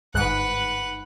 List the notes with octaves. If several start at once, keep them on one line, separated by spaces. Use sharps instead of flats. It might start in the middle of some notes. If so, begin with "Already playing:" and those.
G1 G#2 B4 F#5 F#6